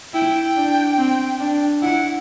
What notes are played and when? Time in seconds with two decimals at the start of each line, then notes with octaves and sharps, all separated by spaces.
0.14 E4 G5
0.56 D4
0.98 C4
1.40 D4
1.82 E4 F#5